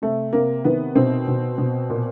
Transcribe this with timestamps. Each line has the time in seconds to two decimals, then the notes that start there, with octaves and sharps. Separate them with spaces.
0.02 C3 A3
0.33 C3 A#3
0.65 D#3 B3
0.95 B2 C4
1.28 B2
1.58 B2
1.90 A#2